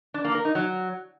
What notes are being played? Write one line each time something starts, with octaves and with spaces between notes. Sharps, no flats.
D4
A#3
A#4
D#4
F#3